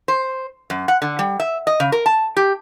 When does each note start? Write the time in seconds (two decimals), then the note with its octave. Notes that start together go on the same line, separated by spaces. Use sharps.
0.08 C5
0.70 F#2
0.88 F#5
1.02 D3
1.19 G3
1.40 E5
1.67 D#5
1.80 C#3
1.92 A#4
2.06 A5
2.37 G4